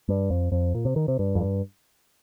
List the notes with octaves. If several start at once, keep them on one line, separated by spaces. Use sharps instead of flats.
G2
F2
F2
A#2
C3
D#3
C3
G2
F2
G2